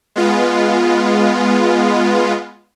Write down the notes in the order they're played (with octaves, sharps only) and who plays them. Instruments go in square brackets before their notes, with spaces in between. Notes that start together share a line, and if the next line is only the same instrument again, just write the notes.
[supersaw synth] G#3 B3 F4